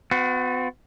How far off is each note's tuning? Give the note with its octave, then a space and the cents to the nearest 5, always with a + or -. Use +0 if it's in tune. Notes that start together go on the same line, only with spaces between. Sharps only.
B3 +40 F#4 -30